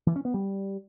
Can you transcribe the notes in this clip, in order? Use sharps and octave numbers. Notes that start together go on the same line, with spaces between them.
E3
C#4
B3
G3